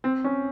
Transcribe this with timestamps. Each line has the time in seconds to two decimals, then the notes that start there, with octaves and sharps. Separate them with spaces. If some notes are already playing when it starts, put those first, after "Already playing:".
0.04 C4
0.24 C#4